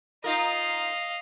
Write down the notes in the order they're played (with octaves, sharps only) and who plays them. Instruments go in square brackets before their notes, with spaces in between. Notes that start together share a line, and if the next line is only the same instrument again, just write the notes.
[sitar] D#4 F4 A#4 [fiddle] D#5 F5